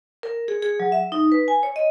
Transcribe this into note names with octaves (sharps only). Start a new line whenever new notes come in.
A#4
G#4
G#4
F#3
E5
D#4
B4
G#5
C#5
D#5